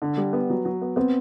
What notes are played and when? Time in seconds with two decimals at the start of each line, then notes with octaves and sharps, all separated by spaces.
0.02 D3
0.17 G3
0.33 B3
0.50 F#3
0.65 F#3
0.81 B3
0.96 B3 C4